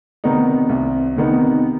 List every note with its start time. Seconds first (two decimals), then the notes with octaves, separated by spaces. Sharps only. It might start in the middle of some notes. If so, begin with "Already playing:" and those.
0.24 C3 D#3 B3 D#4
0.69 C2
1.16 C3 D#3 B3 D#4